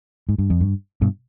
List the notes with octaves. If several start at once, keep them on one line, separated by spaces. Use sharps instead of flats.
G#2
G2
F2
G2
G2 B2